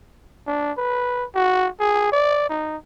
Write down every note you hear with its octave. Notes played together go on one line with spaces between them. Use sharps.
D4
B4
F#4
G#4
D5
D#4